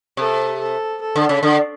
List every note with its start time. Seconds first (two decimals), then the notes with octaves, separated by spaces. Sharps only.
0.17 C3 A4
0.60 A4
1.02 A4
1.16 D3
1.29 C#3
1.43 D3